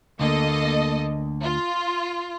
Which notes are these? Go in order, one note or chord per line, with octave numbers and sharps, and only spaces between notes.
D2 D3 A#3 A4 D#5
F4